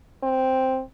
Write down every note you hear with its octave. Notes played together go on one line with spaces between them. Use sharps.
C4